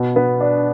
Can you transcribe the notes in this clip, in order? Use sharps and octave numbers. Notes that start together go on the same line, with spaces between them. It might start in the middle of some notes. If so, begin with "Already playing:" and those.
Already playing: B2
B3
D4